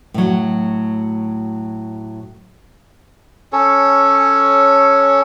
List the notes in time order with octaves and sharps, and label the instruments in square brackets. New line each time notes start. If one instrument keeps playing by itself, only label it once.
[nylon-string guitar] A2 F#3
[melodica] C#4 A4 C#5